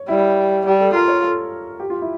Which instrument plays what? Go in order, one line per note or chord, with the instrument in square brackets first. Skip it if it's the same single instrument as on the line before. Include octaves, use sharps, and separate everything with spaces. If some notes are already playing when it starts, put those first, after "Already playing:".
Already playing: [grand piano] C#5
[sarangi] G3 [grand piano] E4
[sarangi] G3 [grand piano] G4
[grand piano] A4
[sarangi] F4 [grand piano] A#4
[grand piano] C#5
A4
G4
F4
E4